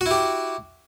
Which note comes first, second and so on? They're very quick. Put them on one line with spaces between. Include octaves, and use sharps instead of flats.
F#4 E4 G4